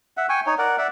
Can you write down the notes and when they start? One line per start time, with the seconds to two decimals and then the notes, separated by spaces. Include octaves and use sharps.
0.17 E5 F#5
0.29 G5 G#5 C#6
0.46 D#4 C#5
0.58 A#4 D5 F#5
0.78 D5 E5 F#5